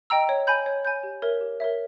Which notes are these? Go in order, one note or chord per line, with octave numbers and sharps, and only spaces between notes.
D#5 G5 A#5 E6
C#5
G#5 B5 G6
C#5
G#5 B5 G6
G4
A#4 C#5 E5
G4
A#4 C#5 E5